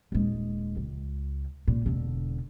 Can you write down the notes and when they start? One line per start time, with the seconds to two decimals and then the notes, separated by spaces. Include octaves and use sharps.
0.12 D#1 G#3
0.77 C#2
1.68 A#2
1.86 E1 D3